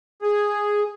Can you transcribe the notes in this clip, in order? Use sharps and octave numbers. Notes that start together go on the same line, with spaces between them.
G#4